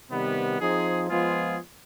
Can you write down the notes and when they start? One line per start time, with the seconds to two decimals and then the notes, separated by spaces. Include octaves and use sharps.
0.09 C3 D#3 G3 B3
0.58 F3 C4 D#4 G#4
1.07 F3 G#3 B3 F4 G#4